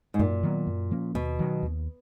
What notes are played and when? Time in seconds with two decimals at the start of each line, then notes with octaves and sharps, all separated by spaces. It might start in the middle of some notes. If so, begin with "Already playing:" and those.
0.14 G#2
0.19 F#2 A#2
0.43 D#3 F#3 B3
0.67 F#2
0.91 F3 A#3 C#4
1.15 D#2 B2
1.39 D#3 F#3
1.63 D#2